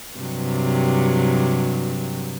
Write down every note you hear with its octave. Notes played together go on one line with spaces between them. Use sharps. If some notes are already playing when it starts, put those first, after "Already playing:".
G2 C3 F#3